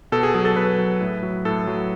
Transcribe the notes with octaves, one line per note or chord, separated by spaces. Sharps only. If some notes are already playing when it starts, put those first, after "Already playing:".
B2 A4
G#4
F#3 G#4
A4
B2 B4
F#3
A2
F#3
A2 A4
F#3